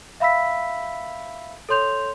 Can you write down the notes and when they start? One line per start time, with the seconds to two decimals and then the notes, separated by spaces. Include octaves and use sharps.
0.20 E5 F5 B5 E6 B6
1.69 A4 C#5 C6 G6 F7